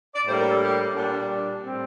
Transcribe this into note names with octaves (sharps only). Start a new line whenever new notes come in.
D5
A2 G3 A#3 D4 C5
A#4
A4
G4
A#2 G3 D4
A2 G3 C4